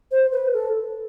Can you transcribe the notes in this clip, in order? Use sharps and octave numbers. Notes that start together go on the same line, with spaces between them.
C5
B4
A4